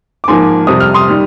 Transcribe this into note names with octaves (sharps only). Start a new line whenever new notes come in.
D6
G#2 F3 A#3 G#5 C6
F2 C3 G3 D#6
F6
C6 D#6
D#3 G3